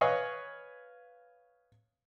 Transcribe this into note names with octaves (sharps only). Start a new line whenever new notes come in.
B4 C#5 D#5 F5 G#5